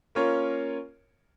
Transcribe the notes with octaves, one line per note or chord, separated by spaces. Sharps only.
A#3 C#4 F4 A#4 C#5